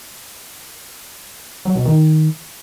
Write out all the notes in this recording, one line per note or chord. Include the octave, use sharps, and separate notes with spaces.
F#3
B2
D#3